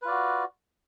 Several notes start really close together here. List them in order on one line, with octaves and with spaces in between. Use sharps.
B4 F4 D5 F#4